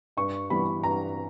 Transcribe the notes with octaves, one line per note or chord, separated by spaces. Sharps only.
G2 C#6
E3 G3 B3 B5
G2 A#5